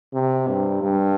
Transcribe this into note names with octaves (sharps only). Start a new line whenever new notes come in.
C3
G2
G2